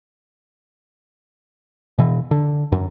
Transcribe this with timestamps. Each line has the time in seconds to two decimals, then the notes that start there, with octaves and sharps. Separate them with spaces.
1.98 B2 E3
2.31 D3
2.72 F#2